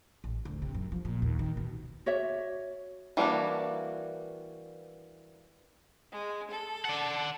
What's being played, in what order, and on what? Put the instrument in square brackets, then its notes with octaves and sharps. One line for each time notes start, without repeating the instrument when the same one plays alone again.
[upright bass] A1
D2
C3
F#2
F3
A#2
D#2
D#3
B2
[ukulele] F#4 C#5 D5 E5
[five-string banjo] E3 G3 A#3 D4 F#4
[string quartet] G#3
A4
[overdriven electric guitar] D5 F#5